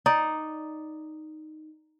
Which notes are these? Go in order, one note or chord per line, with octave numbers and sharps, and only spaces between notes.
D#4 D5